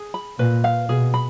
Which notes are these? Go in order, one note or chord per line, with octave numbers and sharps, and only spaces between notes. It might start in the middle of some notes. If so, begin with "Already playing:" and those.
Already playing: G#4
B5
A#2 B4
F5
B2 G#4
B5